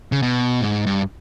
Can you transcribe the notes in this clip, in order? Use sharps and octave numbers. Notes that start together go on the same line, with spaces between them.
C#3
B2
G#2
G2